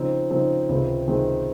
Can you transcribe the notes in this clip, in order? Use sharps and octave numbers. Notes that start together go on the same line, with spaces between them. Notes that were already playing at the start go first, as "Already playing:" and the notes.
Already playing: C#3 F3 C4 D#4
C#3 F3 C4 D#4
C#2 C3 D#3 G#3 C4
C#2 C3 D#3 G#3 C4